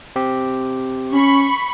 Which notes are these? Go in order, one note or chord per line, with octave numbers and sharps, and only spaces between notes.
C4 G4
C#4 B5 C#6